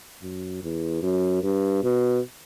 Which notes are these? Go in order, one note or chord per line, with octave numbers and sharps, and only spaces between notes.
F#2
E2
F#2
G2
B2